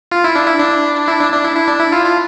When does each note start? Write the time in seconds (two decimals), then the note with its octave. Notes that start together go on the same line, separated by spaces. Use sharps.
0.12 F4
0.24 E4
0.35 D4
0.47 E4
0.59 D4
1.08 E4
1.21 D4
1.33 D4
1.45 E4
1.56 E4
1.68 D4
1.80 E4
1.92 F4
2.05 F4